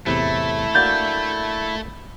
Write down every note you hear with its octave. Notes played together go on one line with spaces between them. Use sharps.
E2 A2 C3 A3 E4
A#3 D4 F#4 G6 A6